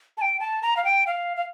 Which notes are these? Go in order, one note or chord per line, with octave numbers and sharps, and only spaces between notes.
A5
G5
A5
A#5
F5
G5
F5
F5